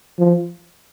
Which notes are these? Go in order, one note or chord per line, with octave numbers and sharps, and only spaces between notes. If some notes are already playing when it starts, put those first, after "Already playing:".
F3